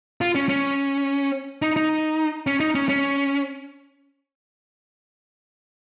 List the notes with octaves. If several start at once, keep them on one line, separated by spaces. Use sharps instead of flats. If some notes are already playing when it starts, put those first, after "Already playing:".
F4
C#4
C#4
D#4
D#4
C#4
D#4
C#4
C#4